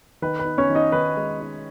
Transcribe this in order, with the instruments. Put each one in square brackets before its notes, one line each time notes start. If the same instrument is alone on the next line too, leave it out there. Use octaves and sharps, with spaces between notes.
[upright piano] D#3 B4
B4
D#4
C#4 C#5
D#3
D#4 D#5
D#3 B4
G#3
D#4